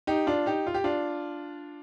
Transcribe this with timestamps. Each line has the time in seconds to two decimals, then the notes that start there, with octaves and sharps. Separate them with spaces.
0.07 D#4 G4
0.27 D4 F4
0.46 D#4 G4
0.67 F4
0.74 G4
0.84 D4 F4